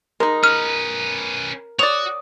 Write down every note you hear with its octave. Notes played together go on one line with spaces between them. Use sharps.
G#3 D#4 A#4
C#4 B4 F6
F#4 C#5 D5 D#6 F7